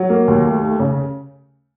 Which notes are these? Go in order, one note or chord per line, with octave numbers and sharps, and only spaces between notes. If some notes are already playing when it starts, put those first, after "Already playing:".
Already playing: F#3
A#3
D#2
A3
A3
C#3